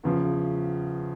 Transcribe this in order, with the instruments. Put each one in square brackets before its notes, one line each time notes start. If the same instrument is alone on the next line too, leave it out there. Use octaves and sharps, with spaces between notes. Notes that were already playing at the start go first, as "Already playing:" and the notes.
[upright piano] E2 C#3 F3